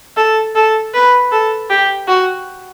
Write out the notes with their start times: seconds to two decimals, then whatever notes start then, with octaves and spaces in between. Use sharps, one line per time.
0.17 A4
0.55 A4
0.94 B4
1.32 A4
1.70 G4
2.08 F#4